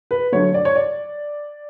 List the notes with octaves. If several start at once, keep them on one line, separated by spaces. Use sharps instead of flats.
B4
D3 F#3 A3 C#5
D5
C#5
D5